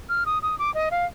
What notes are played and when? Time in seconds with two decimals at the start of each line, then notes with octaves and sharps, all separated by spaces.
0.09 F6
0.26 D#6
0.43 D#6
0.59 D6
0.74 D#5
0.91 F5